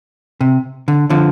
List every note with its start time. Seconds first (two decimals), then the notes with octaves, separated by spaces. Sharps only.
0.41 C3
0.88 D3
1.10 D3 F3